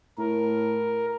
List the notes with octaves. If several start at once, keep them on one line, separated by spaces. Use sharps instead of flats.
A2 A#4